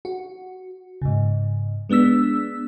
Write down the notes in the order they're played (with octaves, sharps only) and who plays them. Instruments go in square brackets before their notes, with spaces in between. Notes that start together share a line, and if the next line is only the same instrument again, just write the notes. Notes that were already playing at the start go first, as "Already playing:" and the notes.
[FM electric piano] F#4
G#2 C#3
G#3 B3 D4 E6 B6